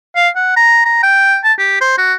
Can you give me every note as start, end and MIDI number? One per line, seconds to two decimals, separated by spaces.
0.16 0.29 77
0.35 0.55 78
0.57 0.83 82
0.85 1.00 82
1.03 1.38 79
1.44 1.53 81
1.58 1.76 67
1.81 1.95 72
1.98 2.14 66